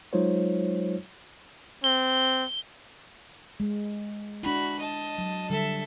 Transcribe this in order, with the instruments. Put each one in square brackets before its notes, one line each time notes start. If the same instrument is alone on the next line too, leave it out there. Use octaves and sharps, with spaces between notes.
[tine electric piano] F#3 G#3 D#4 F4 C5 C#5
[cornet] C4 [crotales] G7
[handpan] G#3
[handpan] D4 E4 [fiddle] F#4 B5
[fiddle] D#5 A5
[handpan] F#3
[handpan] D3 G3 [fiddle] A4 E5